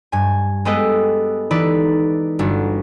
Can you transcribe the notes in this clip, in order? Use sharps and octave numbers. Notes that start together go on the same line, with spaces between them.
G2 G#5
G#3 B3 G4 A4 B4 D#5
E3 D#4 A4 B4 D5
G1 D4 F#4